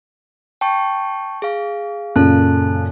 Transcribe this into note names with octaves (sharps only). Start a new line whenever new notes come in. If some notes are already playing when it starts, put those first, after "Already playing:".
G5 A5 C#6
G#4 F5
F#2 A#2 C#3 A4 A5 F#6